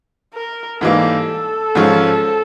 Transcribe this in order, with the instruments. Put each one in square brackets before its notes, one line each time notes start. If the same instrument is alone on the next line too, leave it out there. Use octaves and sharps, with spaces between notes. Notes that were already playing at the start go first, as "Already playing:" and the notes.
[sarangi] A#4
[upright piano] G#2 E3 G3 A#3 D#4 [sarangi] A4
[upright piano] G#2 F3 G#3 C#4 F4